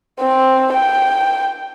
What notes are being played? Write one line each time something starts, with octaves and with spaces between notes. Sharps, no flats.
C4
G5